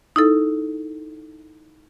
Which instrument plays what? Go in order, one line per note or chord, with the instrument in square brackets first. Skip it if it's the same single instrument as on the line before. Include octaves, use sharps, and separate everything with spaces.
[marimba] D#4 E4 A4